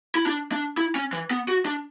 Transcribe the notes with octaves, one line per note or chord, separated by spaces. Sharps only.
E4
D4
D4
E4
C#4
E3
B3
F#4
D4